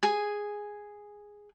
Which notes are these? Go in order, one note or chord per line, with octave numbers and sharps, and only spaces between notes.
G#4 G#5